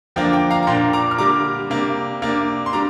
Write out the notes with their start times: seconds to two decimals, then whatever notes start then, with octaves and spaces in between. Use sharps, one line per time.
0.16 D3 F3 A#3 D4 G5
0.33 G5
0.50 F5 A#5
0.63 A#5
0.67 A#2 A#3 D4 G5 C6
0.93 A#5 D6
1.11 F6
1.18 D3 G3 A#3 A#5 D6
1.70 C3 A#3 D4
2.22 C3 A#3 D4
2.66 C6
2.73 G3 D4 A#5 D6